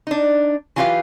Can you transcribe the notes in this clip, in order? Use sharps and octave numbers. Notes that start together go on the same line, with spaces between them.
D4 D#4
E3 F#3 F4 G4 B4 F5